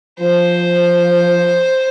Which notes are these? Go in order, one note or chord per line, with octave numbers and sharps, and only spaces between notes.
F3 C5